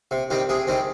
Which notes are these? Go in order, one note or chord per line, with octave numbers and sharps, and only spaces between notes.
C3
D#3 G3 C4
C3 G#4
D#3 G3 C4